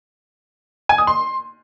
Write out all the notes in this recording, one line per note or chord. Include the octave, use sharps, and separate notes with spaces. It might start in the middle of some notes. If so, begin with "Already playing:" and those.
G#5
D#6
C6